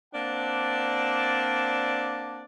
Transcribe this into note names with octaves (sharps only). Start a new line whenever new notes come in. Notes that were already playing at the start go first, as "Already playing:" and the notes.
A#3 C4 D4 D5 F#5 A5